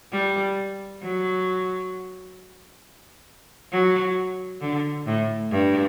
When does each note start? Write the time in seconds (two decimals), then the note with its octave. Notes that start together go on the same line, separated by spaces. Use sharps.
0.12 G3
1.02 F#3
3.72 F#3
4.61 D3
5.07 A2
5.51 G2